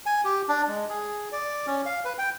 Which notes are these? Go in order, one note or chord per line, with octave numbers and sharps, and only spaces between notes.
G#5
G4
D4
G#3
G#4
D5
C#4
F5
B4
G5